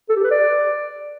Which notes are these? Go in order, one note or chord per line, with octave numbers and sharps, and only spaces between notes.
A4
G4
B4
D5